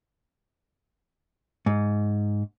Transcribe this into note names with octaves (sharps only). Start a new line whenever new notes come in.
G#2